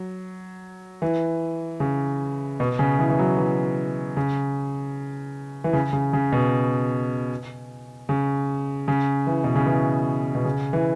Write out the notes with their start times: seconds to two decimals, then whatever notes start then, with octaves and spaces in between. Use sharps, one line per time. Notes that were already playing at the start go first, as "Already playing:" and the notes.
Already playing: F#3
1.02 E3
1.80 C#3
2.60 B2
2.79 C#3
2.99 E3
3.10 E3
3.19 F#3
3.38 E3
4.17 C#3
5.64 E3
5.73 C#3
5.93 C#3
6.13 C#3
6.32 B2
8.09 C#3
8.88 C#3
9.27 E3
9.44 B2
9.55 C#3
9.66 E3
10.35 B2
10.45 C#3
10.73 E3